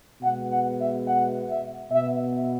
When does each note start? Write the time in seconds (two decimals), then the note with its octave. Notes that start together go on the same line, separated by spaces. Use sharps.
0.22 B2 G#3 B3 F#5
0.50 F#5
0.79 E5
1.07 F#5
1.49 E5
1.91 B2 B3 E5